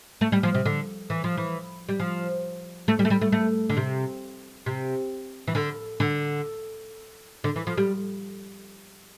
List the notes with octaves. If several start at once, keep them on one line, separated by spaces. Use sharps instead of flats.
A3
G3
F3
C3
D3
E3
F3
E3
G3
F3
A3
G3
A3
G3
A3
A3
D3
C3
C3
E3
D3
D3
D3
E3
F3
G3